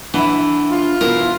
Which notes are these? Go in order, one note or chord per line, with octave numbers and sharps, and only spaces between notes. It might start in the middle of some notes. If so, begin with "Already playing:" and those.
E3 D4 E5 F#5 B5
F4
B2 E3 E4 F#4 A#4 C5